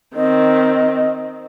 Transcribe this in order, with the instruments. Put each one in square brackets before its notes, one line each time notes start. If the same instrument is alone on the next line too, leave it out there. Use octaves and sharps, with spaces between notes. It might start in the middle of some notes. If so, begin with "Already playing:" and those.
[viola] D#3 C4 [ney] D#5